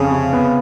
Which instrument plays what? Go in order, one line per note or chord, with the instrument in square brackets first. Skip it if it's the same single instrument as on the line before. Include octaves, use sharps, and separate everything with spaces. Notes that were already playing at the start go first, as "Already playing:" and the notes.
Already playing: [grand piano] F2 [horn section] C#3
[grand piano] C3
B3